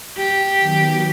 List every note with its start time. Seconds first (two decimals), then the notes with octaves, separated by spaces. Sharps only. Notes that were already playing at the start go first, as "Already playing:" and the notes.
0.18 G4
0.60 D#3 F#3 B3